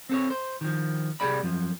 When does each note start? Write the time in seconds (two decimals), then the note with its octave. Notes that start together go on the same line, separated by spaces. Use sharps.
0.09 C4 A4 C#5
0.30 C5
0.61 D#3 F3
1.20 C2 G3 G#4 D5 B5
1.43 F#2 F3